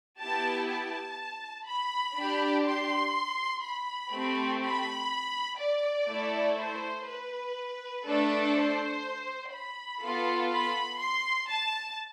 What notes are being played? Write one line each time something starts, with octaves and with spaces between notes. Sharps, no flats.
B3 E4 G4 A5
A5
B5
D4 G4
C6
B5
A3 C4 G4
B5
D5
A3 E4 A4
C5
B4
A3 D4 A4
C5
B5
B3 F4 A4
B5
C6
A5